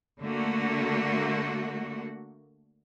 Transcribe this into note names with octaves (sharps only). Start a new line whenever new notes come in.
D3 A3 A#3 F#4